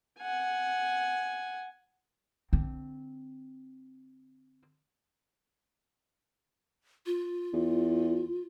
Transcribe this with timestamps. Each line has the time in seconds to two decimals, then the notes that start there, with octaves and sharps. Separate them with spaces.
0.19 F#5 G#5
2.53 D3 C4
7.06 F4
7.53 E2